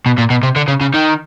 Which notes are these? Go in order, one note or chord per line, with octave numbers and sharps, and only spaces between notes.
B2
A#2
B2
C3
D3
C#3
C#3
D#3